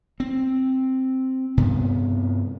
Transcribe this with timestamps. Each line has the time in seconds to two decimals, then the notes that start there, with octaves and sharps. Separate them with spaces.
0.20 C4
1.57 G2 C3 B3